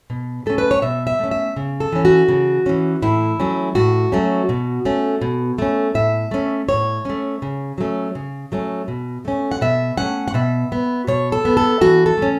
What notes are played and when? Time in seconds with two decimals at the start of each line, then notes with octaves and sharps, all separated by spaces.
0.10 B2
0.46 A3 C#4 A4
0.58 B4
0.71 C#5
0.82 B2 E5
1.07 E5
1.19 A3 C#4
1.31 E5
1.56 C#3
1.80 A4
1.92 E3 C#4
2.05 F#4
2.29 C#3
2.66 E3 C#4
3.02 A2 E4
3.40 F#3 A3 C#4
3.75 A2 F#4
4.12 F#3 A3 C#4
4.49 B2
4.85 A3 C#4
5.21 B2
5.58 A3 C#4
5.95 A2 E5
6.31 A3 C#4
6.69 A2 C#5
7.05 A3 C#4
7.42 C#3
7.78 F#3 A3 C#4
8.15 C#3
8.52 F#3 A3 C#4
8.88 B2
9.25 A3 C#4
9.51 F#5
9.61 B2 E5
9.98 A3 C#4 F#5
10.28 F#5
10.34 B2 E5
10.72 B3
11.07 B2 C#5
11.32 A4
11.45 B3
11.57 A4
11.81 E3 F#4
12.06 A4
12.17 A3 C#4